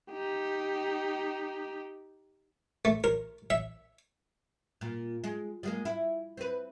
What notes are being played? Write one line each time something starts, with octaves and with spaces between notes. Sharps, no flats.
D#4 G4
A3
A#4
E5
A#2
G#3
G3 G#3 A#3
E4
C4 B4